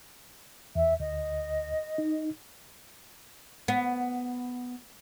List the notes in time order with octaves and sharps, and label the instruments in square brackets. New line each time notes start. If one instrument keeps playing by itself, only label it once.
[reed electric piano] E2 [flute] E5
[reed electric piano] D2 [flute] D#5
[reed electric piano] D#4
[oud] B3